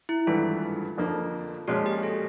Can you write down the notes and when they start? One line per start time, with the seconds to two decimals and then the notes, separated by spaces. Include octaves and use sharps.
0.09 E4
0.27 G#1 G2 E3 A3 F4
0.98 F2 D3 F3 A#3
1.68 A#2 F3 G#3 C#4 F#4
1.86 G4
2.03 A4